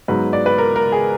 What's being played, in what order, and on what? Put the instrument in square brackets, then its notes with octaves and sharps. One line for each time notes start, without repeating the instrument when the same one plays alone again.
[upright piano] G#2 F#3 B3 B4
D5
B4
A#4
A#4
G#4